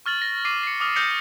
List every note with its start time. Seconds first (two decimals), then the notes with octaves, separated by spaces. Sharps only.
0.06 C#6 F6 A6 F#7
0.22 A#6
0.45 D6 C7 D#7
0.63 C7 C#7
0.80 D6 D#6 F6
0.96 D#6 F6 G6 A#6 C7 C#7